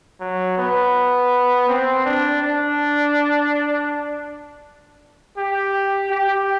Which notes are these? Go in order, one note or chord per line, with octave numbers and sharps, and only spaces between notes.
F#3
B3
C4
D4
D4
G4
G4